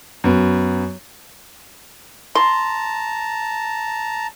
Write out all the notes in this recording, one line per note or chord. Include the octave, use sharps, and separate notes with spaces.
F#2 B3
A5 A#5 C6